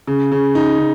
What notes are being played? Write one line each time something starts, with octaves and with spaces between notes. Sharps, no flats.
C#3
C#3
D#4
C#3